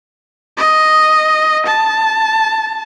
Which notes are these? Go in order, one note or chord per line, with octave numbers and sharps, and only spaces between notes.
D#5
A5